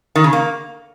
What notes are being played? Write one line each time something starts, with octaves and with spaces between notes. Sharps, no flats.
D#3
C#3
A#3